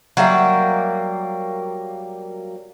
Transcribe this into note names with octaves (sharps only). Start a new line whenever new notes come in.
F#3 G3 A#3 E5